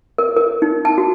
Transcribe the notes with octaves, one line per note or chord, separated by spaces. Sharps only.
A#4
A#4
D#4
A5
F#4